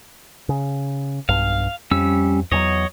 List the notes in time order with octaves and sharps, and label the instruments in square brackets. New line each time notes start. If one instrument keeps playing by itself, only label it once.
[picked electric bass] C#3
[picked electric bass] B1 G2 [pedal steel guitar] F5
[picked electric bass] F2 [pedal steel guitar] G3 C#4 E6
[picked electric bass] E2 E3 F#3 [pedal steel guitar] C#5 D#5